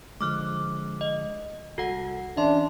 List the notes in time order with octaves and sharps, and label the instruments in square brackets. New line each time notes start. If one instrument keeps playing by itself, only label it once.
[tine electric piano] D3 F3 G#3 [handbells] D6 F6 F#6
[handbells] D#5
[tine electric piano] C2 A4 A#6 [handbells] F#4 F#5
[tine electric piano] E3 C#4 [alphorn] D4 [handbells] E5 C6